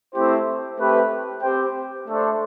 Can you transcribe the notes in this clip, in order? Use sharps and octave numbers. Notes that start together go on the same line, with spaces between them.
A3 C4 E4 G4 C5
A3 C4 G4 B4
C4 G4 C5 G5
A3 D4 A4 C5